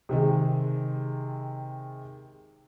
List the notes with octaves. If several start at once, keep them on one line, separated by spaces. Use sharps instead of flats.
C3 D#3 G#3